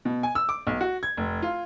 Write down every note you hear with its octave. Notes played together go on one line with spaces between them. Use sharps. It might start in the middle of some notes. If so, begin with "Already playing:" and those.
B2
G#5
E6
D6
B1
F#4
G#6
F1
F4